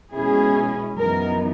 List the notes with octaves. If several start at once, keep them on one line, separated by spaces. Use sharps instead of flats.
B2 G#3 C#4 E4 G#4
F#2 E3 B3 D#4 A#4